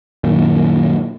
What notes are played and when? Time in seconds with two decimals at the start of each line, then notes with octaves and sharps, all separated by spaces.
0.24 F#2 A#2 D#3